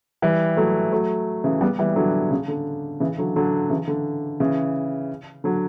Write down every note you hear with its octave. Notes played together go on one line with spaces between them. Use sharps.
E3 G3
F#3 A3
F#3 A3
C#3 E3
G3 B3
E3 G3
D3 F#3
C#3
D3
C#3 E3
D3 F#3
D3 F#3
C#3 E3
D3
C#3 E3
D3 F#3